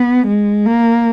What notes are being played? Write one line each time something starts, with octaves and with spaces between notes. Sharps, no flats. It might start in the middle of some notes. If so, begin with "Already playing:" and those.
Already playing: B3
G#3
A#3